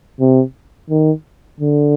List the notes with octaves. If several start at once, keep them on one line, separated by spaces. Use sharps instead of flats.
C3
D#3
D3